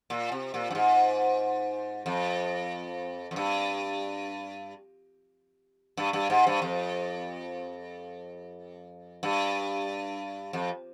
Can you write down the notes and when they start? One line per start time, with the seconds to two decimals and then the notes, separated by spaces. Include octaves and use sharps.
0.10 A#2
0.32 C3
0.54 A#2
0.71 G2
0.75 G#2
2.06 F2
3.31 F2
3.36 G2
5.97 G2
6.13 G2
6.30 G#2
6.47 G2
6.62 F2
9.23 G2
10.53 F2